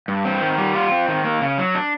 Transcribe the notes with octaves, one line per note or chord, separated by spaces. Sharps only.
G2
C4
D#3
G3
F4
C4
D#3
A#3
C#3
F#3
D4